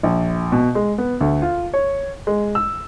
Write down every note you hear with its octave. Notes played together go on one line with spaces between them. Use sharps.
A#1
B2
G#3
B3
D2
F4
C#5
G#3
E6